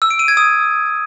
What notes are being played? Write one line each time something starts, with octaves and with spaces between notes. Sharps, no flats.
E6
D7
D#7
G#6
D#6